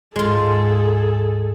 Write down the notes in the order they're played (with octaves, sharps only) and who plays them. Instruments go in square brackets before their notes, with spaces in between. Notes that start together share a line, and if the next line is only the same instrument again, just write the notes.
[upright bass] D2 G#2 [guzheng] G#3 F4 [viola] G#4 A4